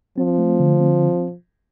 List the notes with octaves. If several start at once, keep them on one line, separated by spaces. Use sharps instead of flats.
F3 C4
A3
D3
C4